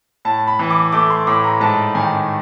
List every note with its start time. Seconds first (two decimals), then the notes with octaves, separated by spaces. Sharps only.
0.25 A2 A5
0.47 B5
0.59 E3
0.70 D6
0.92 A3 D6
1.10 C6
1.27 A2 D6
1.44 A#5
1.61 G#2 A5
1.95 D#3 G#5